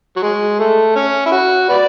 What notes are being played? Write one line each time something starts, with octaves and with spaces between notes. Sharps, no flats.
F#3
G#3
A3
C#4
E4
F#4
F#4 B4 D5